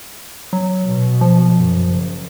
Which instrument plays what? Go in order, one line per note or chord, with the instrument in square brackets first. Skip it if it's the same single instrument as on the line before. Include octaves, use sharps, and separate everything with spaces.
[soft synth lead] F#3
[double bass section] B2
[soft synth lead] F3
[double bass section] F#2
F#1